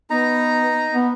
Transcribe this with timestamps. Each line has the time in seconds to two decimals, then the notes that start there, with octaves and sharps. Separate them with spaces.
0.10 B3 D#4 A#5
0.93 B3